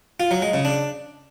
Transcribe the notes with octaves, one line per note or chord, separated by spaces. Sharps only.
F4
F#3
G#3
C#3
D4